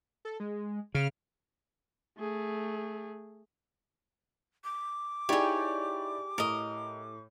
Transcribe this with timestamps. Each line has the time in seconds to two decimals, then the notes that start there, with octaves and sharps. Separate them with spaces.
0.25 A4
0.40 G#3
0.95 C#3 F6
2.18 A3 G#4
4.64 D6
5.29 D#4 E4 G4 G#4 C#5 D5 G5
6.38 A2 A#4 D#5